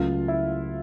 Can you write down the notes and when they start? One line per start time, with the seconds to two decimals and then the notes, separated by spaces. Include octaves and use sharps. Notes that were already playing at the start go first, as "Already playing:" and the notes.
Already playing: C#2 C#3 F#3 A3 F4
0.28 E4